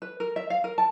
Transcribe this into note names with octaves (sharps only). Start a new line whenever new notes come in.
B4
A#4
E5
F5
A#4
A5